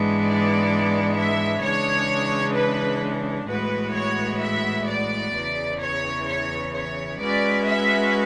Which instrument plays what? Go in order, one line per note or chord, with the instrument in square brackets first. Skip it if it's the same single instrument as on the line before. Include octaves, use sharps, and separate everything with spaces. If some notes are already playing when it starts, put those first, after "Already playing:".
Already playing: [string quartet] G#2 E3 G#3 B3 D4
[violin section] D5
E5
[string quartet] C#3 E3 G#3 D4 [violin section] C#5
[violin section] B4
[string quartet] A2 E3 G#3 B3 F#4 [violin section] B4
[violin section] C#5
E5
D5
[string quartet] E2 C#3 E3
[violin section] C#5
C#5
C#5
[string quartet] G#3 C#4 F#4 B4 [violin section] D5
[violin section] E5